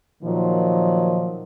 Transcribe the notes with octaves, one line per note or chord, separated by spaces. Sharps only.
A#2 D#3 F3 F#3